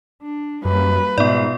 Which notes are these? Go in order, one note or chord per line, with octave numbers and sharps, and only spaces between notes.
D4
F#2 G3 A#3 B4
G#2 B2 B3 F4 D5